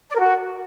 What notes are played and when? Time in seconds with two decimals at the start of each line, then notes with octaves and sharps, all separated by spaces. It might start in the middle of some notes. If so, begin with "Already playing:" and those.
0.10 D5
0.15 A#4
0.20 F#4